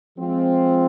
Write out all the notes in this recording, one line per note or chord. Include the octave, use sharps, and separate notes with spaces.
F3 G#3 C4 F4